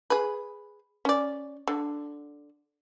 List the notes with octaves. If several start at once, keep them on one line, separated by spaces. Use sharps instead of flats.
G#4 B4
C#4 D5
D3